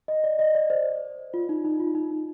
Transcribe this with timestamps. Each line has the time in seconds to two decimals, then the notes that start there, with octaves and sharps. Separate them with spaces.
0.08 D#5
0.24 D5
0.39 D#5
0.55 D5
0.70 C5
1.34 F4
1.49 D#4
1.65 D#4
1.80 F4
1.95 D#4
2.11 D#4